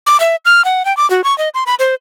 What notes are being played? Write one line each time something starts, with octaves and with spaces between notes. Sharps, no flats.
D6
E5
F6
F#5
G5
D6
F#4
C#6
D#5
C6
B5
C5